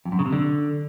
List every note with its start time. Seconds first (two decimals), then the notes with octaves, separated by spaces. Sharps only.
0.05 F2
0.12 F#2
0.19 C#3
0.26 C3
0.33 D3